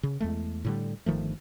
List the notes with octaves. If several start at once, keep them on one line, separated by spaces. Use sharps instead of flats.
C#3
E2 G#3 A3
A2 D3 G3
G1 D#3 F3 A3